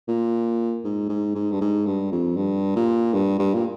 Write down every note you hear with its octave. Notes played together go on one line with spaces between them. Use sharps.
A#2
G#2
G#2
G#2
G2
G#2
G2
F2
G2
A#2
G2
G2
A#2